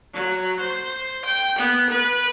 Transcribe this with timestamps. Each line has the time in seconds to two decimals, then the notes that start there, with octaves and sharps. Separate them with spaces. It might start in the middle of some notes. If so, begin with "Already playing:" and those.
0.14 F#3
0.60 C5
1.25 G5
1.58 B3
1.90 B4